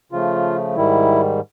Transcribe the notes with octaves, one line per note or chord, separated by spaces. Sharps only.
C#3 F3 A3 F4
G#2 D#3 G3 E4